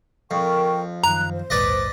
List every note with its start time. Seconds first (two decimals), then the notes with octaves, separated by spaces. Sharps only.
0.31 F2 A#4 G5 C#6
1.04 F#2 D#3 A#5 F#6
1.32 C5
1.50 A#1 D#2 G#2 B4 D5 D#5